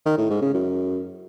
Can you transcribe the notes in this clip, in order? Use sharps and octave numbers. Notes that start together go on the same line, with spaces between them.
D#3
A2
G#2
C#3
F#2